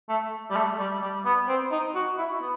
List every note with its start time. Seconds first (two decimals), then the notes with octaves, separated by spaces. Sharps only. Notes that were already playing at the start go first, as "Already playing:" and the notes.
0.09 A3
0.50 G3
0.56 A3
0.79 G3
1.02 G3
1.25 B3
1.48 C4
1.71 D#4
1.95 F#4
2.18 E4
2.41 B3